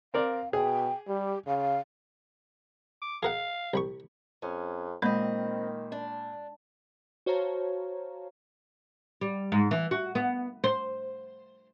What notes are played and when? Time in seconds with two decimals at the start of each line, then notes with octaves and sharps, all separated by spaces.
0.14 C4 A#4 D5 F5
0.53 B2 G#4 G5
1.08 G3 G4
1.47 C#3 F5
3.02 D6
3.23 G#4 A#4 F5 F#5
3.74 C2 B5 C#6
4.42 F2 C#4
5.02 A#2 D#3 G#3 C4 D#5 B5 G6
5.92 D4
7.26 F#4 C5 C#5 F5 A5 A#5
9.21 G3
9.52 G#2
9.71 E3
9.91 F#4
10.15 B3
10.64 C5